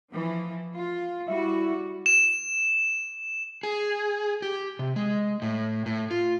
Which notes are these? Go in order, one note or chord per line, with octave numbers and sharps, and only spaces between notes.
E3 F3
F4
G3 E4 F#4
E7
G#4
G4
C3
G#3
A2
A2
F4